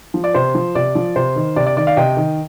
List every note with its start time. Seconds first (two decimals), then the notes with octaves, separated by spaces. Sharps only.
0.14 F3
0.24 D5
0.34 C3 C5
0.55 F3
0.75 C3 D5
0.95 F3
1.16 C3 C5
1.36 D#3
1.56 C3 D5
1.66 D5
1.77 D#3 D5
1.87 D5 F5
1.96 C3 D#5 G5
2.17 D#3